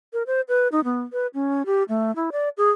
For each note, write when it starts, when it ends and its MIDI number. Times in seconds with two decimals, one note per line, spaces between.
0.13 0.23 70
0.27 0.41 72
0.49 0.68 71
0.72 0.83 63
0.84 1.02 59
1.13 1.27 71
1.34 1.63 61
1.66 1.83 67
1.89 2.14 57
2.16 2.30 64
2.32 2.49 74
2.57 2.70 68